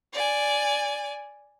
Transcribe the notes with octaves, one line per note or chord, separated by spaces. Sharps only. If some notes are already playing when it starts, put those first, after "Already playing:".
D5 G#5